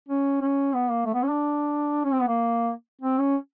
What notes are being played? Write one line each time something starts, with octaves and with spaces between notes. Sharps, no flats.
C#4
C#4
B3
A#3
A3
B3
C#4
D4
C#4
C4
B3
A#3
C4
C#4